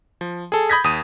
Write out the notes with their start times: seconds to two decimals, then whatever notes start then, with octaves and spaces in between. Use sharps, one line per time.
0.21 F3
0.52 G#4 A4
0.70 B5 D#6 G6 G#6 A#6 B6
0.84 D#2 D#6 D#7